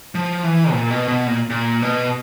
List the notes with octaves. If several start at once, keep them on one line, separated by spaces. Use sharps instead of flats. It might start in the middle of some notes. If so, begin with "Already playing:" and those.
F3
E3
A#2
B2
B2
A#2
A#2
B2